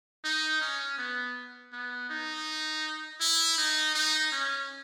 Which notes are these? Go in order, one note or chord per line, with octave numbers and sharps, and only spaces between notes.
D#4
C#4
B3
B3
D#4
E4
D#4
D#4
C#4